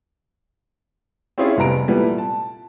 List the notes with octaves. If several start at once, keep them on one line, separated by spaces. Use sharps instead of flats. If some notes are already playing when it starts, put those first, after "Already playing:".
C4 C#4 E4 F4 G#4 C#5
F1 G3 B3 A#5 D7
A#2 E3 G3 A3 B3
A5